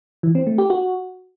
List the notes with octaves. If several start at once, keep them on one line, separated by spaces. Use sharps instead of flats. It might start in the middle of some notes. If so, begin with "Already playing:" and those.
E3
C4
A3
G4
F#4